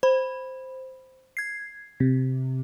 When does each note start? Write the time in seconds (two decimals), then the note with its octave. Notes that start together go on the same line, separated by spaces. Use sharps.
0.03 C5 B5
1.37 G#6 C7
2.00 C3